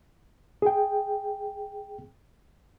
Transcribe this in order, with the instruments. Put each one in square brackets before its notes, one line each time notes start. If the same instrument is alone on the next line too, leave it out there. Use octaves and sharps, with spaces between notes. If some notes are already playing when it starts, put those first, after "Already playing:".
[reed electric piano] G#4 G5